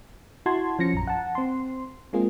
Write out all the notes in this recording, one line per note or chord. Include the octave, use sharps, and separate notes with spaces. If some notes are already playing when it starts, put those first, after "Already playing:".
E4 F#4 A5 C6 G#6
F3 C#4 A#6 C#7
A#1 F#2 A#5
F#5 A5
C4 C6
G#3 A#3 C4 F4 G#4